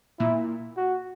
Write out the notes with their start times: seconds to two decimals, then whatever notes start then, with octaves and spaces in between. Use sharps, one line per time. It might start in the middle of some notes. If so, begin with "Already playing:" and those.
0.19 A#2 E4
0.77 F#4